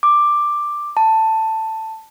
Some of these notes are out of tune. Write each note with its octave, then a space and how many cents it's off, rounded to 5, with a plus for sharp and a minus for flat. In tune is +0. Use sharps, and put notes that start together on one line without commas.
D6 +10
A5 +10